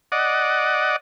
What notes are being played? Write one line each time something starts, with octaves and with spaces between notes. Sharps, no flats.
D5 D#5 F#5